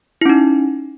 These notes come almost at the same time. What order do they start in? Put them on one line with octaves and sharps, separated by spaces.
E4 C#4 D#4